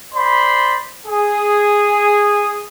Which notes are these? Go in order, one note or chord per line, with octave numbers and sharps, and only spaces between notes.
C5 D5 B5 C6
G#4